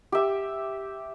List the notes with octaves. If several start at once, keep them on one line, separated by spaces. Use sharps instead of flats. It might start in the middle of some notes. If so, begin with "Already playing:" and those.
G4 E5